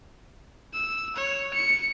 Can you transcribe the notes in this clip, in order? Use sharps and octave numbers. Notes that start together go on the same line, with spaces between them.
E6
C#5
C#7